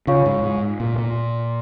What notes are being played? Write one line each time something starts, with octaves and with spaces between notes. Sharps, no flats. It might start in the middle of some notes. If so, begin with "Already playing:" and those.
C#3 F4 C#5 F5 C#6
G#2
G#2
A#2
A#2